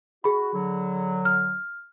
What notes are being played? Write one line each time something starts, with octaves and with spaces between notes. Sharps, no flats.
F#4 G#4 B5
D3 F#3
F6